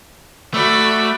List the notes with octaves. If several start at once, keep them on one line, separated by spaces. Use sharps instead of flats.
A3 F#4 D5 B5